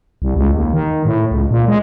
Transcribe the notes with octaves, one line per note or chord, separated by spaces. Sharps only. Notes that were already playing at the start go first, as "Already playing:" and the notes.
C2
C#2
D#2
D#3
A2
C#2
A#2
G#3